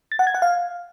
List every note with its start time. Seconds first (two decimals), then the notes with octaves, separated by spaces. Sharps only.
0.12 A6
0.19 F#5
0.27 G#6
0.34 F#5
0.42 F5